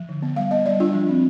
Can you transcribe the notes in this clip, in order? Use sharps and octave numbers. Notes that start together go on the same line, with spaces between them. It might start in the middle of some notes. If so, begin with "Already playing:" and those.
Already playing: F3
D3
B3
G3 F5
B3 D#5
G3 D5
D4 F4
F3
C4